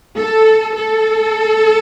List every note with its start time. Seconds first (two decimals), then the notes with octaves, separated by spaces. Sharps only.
0.18 A4
0.76 A4